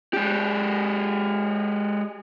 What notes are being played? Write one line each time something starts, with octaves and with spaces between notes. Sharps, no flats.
G#3 G4